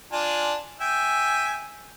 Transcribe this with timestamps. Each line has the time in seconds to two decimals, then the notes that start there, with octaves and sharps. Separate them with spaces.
0.12 D4 F4 G#5
0.81 E5 G5 G#5